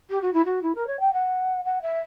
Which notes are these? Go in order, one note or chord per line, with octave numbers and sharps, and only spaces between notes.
G4
F#4
E4
F#4
E4
A#4
C#5
G5
F#5
F#5
E5